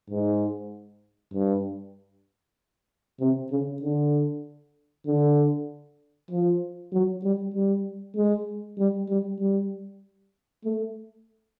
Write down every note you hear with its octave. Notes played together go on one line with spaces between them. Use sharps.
G#2
G2
C3
C#3
D3
D3
F3
F#3
G3
G3
G#3
G3
G3
G3
A3